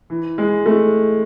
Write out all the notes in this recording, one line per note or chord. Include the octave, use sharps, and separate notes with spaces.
E3
G#3
A3